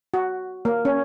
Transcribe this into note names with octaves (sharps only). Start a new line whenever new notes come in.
F#4
A#3
C#4